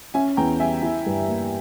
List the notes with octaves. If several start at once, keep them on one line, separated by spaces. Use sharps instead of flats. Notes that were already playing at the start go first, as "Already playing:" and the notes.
C#4 E5 G#5
E2 G5 A#5
G3 E5 G#5
E4
G2
A#3